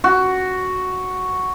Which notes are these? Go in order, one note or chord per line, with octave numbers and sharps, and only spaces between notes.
F#4